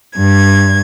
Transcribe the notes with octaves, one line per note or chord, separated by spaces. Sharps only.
G2 G#6